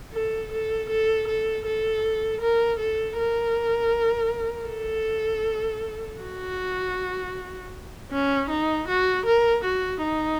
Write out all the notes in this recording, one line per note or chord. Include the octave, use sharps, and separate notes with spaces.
A4
A4
A4
A4
A4
A#4
A4
A#4
A4
F#4
C#4
D#4
F#4
A#4
F#4
D#4